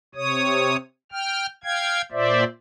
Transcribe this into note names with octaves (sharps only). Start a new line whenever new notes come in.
C3 C#5 D#6
G5 F6
F5 G5 G#6
A#2 C5 D5 E5